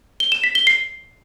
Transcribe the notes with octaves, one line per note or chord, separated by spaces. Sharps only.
G7
E7
B6
G7
C7